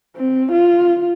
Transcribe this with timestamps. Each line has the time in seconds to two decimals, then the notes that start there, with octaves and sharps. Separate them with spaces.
0.16 C4
0.52 F4